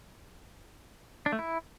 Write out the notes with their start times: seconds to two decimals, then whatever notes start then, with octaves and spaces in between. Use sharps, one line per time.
1.26 D4
1.32 A3
1.39 E4